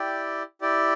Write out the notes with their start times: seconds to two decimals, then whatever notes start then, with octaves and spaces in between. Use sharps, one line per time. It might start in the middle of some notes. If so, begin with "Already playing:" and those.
Already playing: E4 G4 D5 G5
0.61 E4 G4 D5 G5